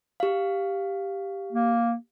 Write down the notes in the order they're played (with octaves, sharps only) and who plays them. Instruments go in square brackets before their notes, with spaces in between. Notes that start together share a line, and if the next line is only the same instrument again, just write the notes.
[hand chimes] G4 F5
[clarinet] A#3